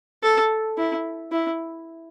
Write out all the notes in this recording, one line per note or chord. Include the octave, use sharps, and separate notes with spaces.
A4
E4
E4